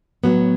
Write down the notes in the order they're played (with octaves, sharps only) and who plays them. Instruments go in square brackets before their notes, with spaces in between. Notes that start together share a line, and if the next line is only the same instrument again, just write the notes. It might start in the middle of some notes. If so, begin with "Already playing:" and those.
[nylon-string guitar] A2 F#3 B3